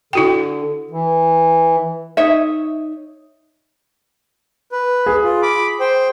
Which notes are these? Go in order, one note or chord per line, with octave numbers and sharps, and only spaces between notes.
D3 E4 F#4 G5
E3
D#4 C#5 D#5 E5
B4
G#4
F4
B5 D6
C5 G5